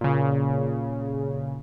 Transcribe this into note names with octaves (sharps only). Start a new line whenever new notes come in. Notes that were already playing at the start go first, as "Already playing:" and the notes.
A#2 C#3